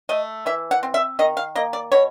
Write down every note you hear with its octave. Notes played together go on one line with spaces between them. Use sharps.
A3 D#5
E3 E5
F#5
C4
E5
D#3 D#5
F5
A#3 D#5
D5
B2 C#5